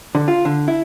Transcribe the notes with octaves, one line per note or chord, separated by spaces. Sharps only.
D3
F4
D3
E4